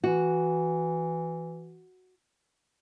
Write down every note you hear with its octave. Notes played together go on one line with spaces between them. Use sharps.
E3 F#4